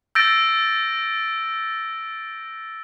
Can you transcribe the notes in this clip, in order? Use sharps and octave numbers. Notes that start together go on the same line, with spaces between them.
E6 G6 A6 A#6 D7